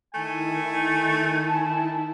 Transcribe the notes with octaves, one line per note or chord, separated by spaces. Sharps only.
D#3 A3 E4 G#5
A5